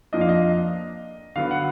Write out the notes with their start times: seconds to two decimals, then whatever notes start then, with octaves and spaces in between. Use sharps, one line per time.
0.13 F2 F3 A#3 D4 D#5
0.21 F5
0.29 D#5
1.36 D3 F#3 B3 F5
1.51 F#5